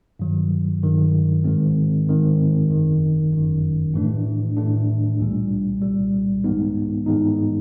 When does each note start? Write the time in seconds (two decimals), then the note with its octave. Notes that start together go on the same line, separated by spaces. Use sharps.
0.19 G2 D#3 F#3
0.82 G2 D#3 F#3
1.44 G#2 D#3 G#3 C4
2.07 G#2 D#3 G#3 C4
2.70 G1 F#2 D#3
3.32 G1 F#2 D#3
3.94 A2 E3 A3 D4
4.57 A2 E3 A3 D4
5.20 C2 A#2 G3
5.82 C2 A#2 G3
6.44 G#2 E3 G#3 B3 D#4
7.06 G#2 E3 G#3 B3 D#4